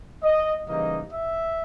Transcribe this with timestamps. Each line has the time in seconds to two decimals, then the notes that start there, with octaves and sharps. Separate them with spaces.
0.22 D#5
0.67 C#3 E3 G3 A#3 D#4 D#5
1.12 E5